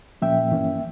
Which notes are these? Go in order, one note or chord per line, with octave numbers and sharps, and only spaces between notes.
A#2 F3 A#3 C#4 E5 G5
G2 E3 A#3 C#4